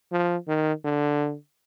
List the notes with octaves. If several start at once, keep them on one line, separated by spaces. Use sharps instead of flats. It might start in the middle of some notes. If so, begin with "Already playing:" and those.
F3
D#3
D3